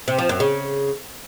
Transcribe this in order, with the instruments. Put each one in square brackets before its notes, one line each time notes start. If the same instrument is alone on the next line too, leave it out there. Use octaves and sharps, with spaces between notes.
[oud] C3
F3
F#2
C#3